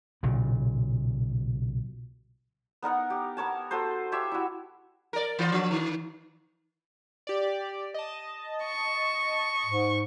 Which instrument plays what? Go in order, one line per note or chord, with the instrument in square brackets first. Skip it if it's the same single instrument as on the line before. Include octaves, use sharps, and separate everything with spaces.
[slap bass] B1 A#2 C#3
[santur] B3 D#4 A#4 F#5
G4
B3 A#4 C#5 A5
F#4 A4 B4 C5
F4 G4 C#5 E5
E4 F#4
[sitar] A#4 D5
E3 F4
F3 D4
D#3
[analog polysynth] G4 D5
D#5 A5
[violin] C#6
[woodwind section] G#2